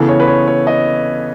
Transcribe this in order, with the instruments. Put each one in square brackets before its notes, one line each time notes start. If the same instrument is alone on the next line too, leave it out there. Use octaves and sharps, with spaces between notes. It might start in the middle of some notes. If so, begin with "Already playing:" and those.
Already playing: [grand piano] C#3 E3 B3 A4
C#5
B4
C#5
C#5
D#5